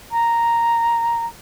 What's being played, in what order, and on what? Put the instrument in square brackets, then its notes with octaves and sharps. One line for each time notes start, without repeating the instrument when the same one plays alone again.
[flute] A#5